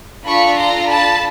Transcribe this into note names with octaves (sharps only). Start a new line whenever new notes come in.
D4 F4 A4 B5 C#6
A#5 C6
A5 B5